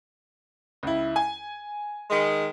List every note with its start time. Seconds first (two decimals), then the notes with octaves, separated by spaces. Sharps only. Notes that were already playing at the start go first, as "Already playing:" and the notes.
0.83 C#2 E4
1.16 G#5
2.10 D#3 G#3